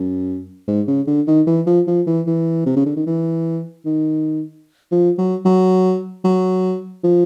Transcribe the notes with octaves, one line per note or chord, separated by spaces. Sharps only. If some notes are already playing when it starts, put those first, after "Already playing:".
Already playing: F#2
G#2
C#3
D3
D#3
E3
F3
F3
E3
E3
C3
C#3
D3
D#3
E3
D#3
F3
F#3
F#3
F#3
F3